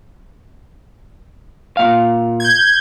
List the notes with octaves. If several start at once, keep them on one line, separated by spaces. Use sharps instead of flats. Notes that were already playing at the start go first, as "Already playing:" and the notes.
A#2 F5
G6 G#6